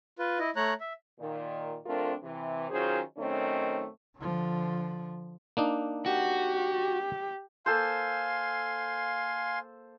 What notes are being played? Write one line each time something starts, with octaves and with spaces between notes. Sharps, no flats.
F4 B4
E4 D#5
A3 C#5 A#5 F#6
E5
A#2 D#3
F2 A3 C4 D4 F4 A#4
C3 E3
D#3 F#3 C#4 F4 G#4 C5
F#2 D#3 A3 C4 C#4 D#4
D3 F3
A#3 D4 D#4
F#4 G4
A#3 A4 C5 F5 G#5 C6